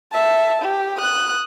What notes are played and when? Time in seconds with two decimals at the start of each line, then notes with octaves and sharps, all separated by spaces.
0.12 E5 A5
0.62 G4
0.97 D#6 F#6